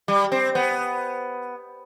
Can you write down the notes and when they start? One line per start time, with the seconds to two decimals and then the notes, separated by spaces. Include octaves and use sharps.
0.08 G3
0.32 C4
0.55 B3